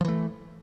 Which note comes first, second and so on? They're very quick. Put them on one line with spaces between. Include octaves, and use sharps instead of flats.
F3 E3 A3